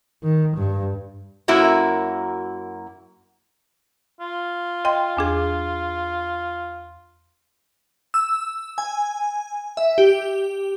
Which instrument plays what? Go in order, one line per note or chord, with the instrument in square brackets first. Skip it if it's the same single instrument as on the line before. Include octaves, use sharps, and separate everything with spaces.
[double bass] D#3
G2
[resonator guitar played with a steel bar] F#2 A#3 E4 F#4 A#4
[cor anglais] F4
[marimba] D#5 G5 C6
E2 D4 G#4
[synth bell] E6
G#5
E5
G4